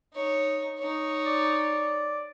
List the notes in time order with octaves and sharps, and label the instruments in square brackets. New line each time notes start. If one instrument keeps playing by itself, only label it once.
[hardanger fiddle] D#4 C#5
D#4 C#5
[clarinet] D5